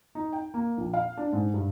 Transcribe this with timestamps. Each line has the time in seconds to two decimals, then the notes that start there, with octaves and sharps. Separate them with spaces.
0.15 D#4
0.33 G5
0.54 A#3
0.78 A#1
0.94 F5
1.17 D4
1.33 G#2
1.54 G2